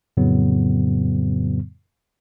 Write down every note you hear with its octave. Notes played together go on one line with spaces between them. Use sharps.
F2 A2 C#3 F#3 B3